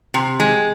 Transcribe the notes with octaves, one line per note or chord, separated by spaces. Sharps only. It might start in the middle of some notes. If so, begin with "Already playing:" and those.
C3
G#3